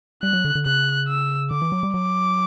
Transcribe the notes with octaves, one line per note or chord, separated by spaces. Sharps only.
G3 F#6
F#3
D3
D3
C#3 F#6
E6
D3 D6
E3
F#3
G3
F#3 D6